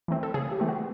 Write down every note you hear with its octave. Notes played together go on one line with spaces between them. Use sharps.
E3 A3 C4
A4
C#3 G#4
G4
E3 A3 C4
F#4